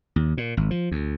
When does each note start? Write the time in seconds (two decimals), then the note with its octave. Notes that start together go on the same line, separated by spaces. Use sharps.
0.16 D#2
0.37 A#2
0.57 G#1
0.71 F3
0.92 D2